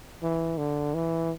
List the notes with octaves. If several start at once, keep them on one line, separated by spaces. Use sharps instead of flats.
E3
D3
E3